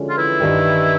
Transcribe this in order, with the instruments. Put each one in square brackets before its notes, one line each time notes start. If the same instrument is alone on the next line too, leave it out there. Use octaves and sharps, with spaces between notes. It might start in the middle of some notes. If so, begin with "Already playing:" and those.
Already playing: [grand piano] D3 F3 G#3 C#4 F#4
[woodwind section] F4
E3 E4
[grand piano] G2 D#3 G3